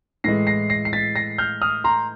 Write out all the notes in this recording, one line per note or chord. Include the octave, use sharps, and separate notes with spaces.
A2 E3 G#3 A#6 C7
A#6 C7
A#6 C7
C7
A6 B6
A#6 C7
F6 G6
D#6 F6
A#5 C6